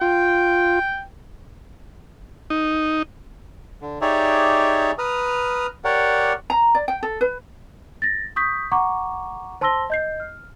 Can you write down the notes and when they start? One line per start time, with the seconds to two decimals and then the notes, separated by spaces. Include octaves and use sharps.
0.01 F4 G5
2.50 D#4
3.82 D3
4.01 D#4 G4 G#4 C#5 D5 E5
4.99 B4 A#5 D#6 F6
5.84 G4 A#4 C#5 D5 F#5
6.50 A#5
6.75 D5
6.88 G5
7.03 A4
7.21 B4
8.02 A6 A#6
8.36 C#6 D#6 G6 B6
8.72 F#5 A#5 C#6 D6
9.61 C5 A5 C6 E6 A#6 G7
9.90 D#5 G6 C7
10.20 F6